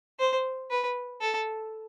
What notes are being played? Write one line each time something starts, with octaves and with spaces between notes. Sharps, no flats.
C5
B4
A4